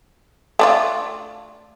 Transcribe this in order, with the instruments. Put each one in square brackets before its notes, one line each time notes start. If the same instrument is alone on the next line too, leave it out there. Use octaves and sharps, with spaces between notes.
[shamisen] A3 D4 F4